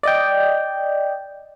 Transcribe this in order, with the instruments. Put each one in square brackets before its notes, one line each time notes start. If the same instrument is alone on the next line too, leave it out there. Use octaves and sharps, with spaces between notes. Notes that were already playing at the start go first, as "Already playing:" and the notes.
[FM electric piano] D5 D#5 G5